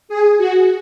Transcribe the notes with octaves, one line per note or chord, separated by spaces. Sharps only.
G#4
F#4